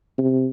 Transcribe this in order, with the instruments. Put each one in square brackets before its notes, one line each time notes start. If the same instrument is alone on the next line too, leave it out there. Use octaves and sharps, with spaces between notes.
[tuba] C3